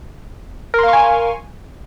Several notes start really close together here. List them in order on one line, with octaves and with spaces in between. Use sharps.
A#4 C6 F5 C#6 G#5